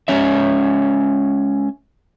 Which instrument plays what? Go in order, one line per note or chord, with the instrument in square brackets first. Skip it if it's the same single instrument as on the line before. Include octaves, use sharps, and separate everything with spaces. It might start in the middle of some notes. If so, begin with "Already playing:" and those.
[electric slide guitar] G#3 C#4 C#5 E5